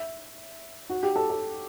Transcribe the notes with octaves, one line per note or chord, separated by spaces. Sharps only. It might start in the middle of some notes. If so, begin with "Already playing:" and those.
Already playing: E5
F#4
G4
A4
A4